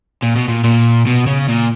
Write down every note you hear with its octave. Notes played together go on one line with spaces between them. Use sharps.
A#2
B2
A#2
A#2
B2
C#3
A#2